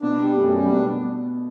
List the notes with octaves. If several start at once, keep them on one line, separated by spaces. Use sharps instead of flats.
B2 B3 D4
G3
F#2 A3
G3
B2 B3 D4